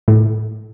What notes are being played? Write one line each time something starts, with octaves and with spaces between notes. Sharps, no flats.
A2